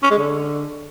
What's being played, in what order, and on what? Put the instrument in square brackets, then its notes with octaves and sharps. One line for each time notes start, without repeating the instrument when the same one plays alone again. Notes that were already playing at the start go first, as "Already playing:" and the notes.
[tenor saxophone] C#4
G#3
D3